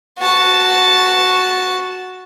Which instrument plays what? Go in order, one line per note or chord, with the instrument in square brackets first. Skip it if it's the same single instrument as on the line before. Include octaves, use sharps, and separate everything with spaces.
[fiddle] F#4 A5